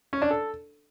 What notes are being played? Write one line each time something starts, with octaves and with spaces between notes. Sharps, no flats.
C#4
D4
A4